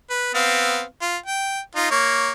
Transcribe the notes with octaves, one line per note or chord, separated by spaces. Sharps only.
B4
B3 C4 F5
F4
G5
D#4 F4
A#3 C#5